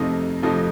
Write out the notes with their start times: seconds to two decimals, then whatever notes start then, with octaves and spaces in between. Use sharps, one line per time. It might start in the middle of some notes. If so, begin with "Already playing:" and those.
Already playing: F2 C3 F3 A3 D#4
0.43 F2 C3 F3 A3 D#4